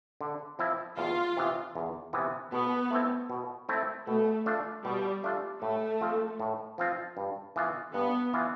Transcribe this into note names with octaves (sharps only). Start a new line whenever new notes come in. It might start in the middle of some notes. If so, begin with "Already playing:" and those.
D3
F3 C4 E4
E2 F4
C3 E3 B3
E2
C3 E3 B3
B2 B3
A3 C4 E4
B2
A3 C4 E4
B2 A3
A3 D4 F4
B2 G3
A3 D4 F4
A2 A3
F3 C4 F4
A2
F3 C4 F4
G2
E3 B3 F4
G2 B3
E3 B3 F4